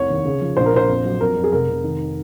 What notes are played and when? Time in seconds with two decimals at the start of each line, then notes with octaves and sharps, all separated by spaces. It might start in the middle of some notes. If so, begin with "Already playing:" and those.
Already playing: F1 C2 C#5
0.10 D#2
0.25 C#3
0.41 F3
0.57 A#1 C5
0.66 A#4
0.74 A#1 C5
0.88 F2
1.05 F#3
1.20 F2 A#4
1.36 F2
1.44 G#4
1.52 F1 A#4
1.68 F1
1.84 D#3